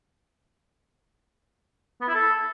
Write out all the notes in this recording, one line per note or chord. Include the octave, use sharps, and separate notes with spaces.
B3
E4
A4